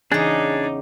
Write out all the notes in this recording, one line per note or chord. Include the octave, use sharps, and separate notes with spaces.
E2 C#3 D4 D#4 G#4 D6